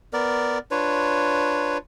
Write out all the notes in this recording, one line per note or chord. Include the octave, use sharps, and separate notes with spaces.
B3 A#4 D5
D4 F4 B4 C#5